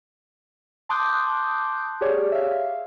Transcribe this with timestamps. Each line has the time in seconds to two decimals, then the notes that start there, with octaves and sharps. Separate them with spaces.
0.89 A5 C6 D6 D#6 F#6 G6
2.01 G4 G#4 C#5 D5
2.32 E5 F5